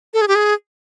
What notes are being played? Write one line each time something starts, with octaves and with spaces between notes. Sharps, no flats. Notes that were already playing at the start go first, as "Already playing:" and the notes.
A4
G#4
G4
G#4